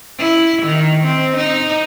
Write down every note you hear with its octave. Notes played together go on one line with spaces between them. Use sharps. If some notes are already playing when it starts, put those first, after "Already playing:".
E4
D#3
C4
D#4